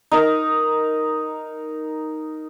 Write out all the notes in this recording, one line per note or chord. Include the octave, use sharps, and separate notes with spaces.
D#4 A#4